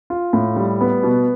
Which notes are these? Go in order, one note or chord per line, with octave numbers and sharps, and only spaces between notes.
F4
A2
G3
B3
B2